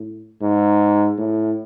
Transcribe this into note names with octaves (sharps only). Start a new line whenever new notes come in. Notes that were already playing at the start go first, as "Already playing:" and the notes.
Already playing: A2
G#2
A2